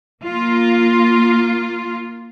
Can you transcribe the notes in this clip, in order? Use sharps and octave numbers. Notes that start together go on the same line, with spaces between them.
A#3 F4